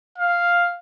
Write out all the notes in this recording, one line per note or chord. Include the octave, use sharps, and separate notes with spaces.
F5